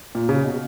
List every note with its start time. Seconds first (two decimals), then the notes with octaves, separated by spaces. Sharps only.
0.15 A#2
0.29 C#3
0.44 B2